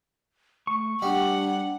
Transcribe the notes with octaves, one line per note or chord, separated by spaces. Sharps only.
A3 C#6
G3 D4 F#5